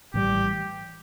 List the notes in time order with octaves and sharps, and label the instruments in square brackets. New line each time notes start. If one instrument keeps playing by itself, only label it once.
[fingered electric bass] A1 A2 E3 G3 [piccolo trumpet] G4